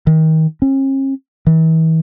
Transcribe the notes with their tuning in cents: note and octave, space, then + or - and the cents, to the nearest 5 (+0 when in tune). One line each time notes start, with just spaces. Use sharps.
D#3 +30
C#4 -45
E3 -40